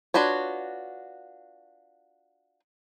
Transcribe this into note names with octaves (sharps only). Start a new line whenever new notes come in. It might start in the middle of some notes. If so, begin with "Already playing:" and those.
D4 F4 F#4 B4 C#5